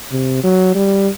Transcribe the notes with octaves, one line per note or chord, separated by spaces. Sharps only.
C3
F#3
G3